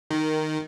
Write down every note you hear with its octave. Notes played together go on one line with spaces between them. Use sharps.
D#3